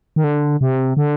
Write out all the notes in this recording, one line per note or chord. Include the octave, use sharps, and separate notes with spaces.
D#3
D3
C3
D3